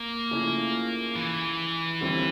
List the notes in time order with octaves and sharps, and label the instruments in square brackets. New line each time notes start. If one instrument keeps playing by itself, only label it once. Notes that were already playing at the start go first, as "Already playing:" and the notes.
Already playing: [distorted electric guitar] A#3
[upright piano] C#3 F3 A3 C#4 E4
[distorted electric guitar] E3
[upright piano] D#2 D3 G3 C4 E4